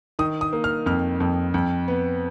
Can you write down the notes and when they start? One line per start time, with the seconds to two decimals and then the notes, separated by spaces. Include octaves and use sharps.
0.19 D#3 D#6
0.41 D#6
0.53 A#3
0.64 F6
0.86 F2 F6
1.20 F2
1.54 F2
1.88 B3